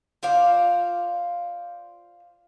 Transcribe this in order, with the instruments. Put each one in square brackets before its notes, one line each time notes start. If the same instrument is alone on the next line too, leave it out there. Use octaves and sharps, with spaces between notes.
[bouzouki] F4 C5 D5 F5